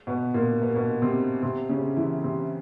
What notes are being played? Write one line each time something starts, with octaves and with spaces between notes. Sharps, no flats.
B2 B3
A#2 A#3
B3
A#3
B2 B3
C3 C4
C3 C4
C#3 C#4
E3 E4
C3 C4